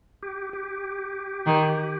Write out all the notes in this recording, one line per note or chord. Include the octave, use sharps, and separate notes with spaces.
G4
G4
D#3